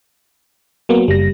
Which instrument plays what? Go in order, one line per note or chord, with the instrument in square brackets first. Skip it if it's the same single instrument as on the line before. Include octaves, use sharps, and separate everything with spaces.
[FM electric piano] F#3 A#3 B3
[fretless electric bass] F#1 [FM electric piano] G3 A#6